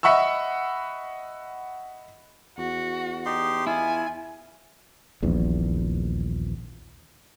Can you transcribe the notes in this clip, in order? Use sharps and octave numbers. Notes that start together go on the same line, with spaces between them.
D#5 E5 F#5 B5 C#6 E6
E2 F#4
D#4 G4 C6
E4 F4 G#5
D#1 A#1 E2